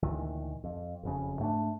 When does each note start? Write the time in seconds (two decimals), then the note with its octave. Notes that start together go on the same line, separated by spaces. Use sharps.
0.03 D2 A#2 D#3 E3
0.64 F2
1.03 F#1 F2 C#3
1.39 G#2 A3 C4 D4